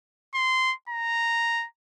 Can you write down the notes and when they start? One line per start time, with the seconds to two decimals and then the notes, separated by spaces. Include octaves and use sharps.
0.35 C6
0.89 A#5